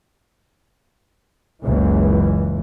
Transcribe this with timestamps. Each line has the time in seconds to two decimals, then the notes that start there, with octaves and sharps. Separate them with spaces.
1.63 F#1 C#2 E3